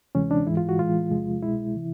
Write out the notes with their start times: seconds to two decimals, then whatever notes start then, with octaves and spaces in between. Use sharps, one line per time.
0.15 D2 C3 E3 G#3 C#4
0.31 D4
0.47 G#2 E3 G#3 E4
0.57 F4
0.69 F#4
0.79 A2 E3 G#3 F4
1.11 E2 C3 F3 G#3
1.42 C2 B2 G#3 E4
1.75 C3 E3